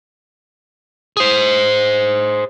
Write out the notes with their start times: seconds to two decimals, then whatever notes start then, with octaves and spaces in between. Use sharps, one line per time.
1.17 G#4 C5